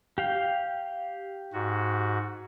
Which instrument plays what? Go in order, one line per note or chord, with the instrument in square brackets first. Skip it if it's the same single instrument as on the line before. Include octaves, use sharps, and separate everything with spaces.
[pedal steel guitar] G4 F5 G5
[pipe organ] G#2 F#4